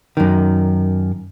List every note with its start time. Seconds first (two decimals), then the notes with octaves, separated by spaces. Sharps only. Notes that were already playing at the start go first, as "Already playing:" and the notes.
0.17 F#2 D#3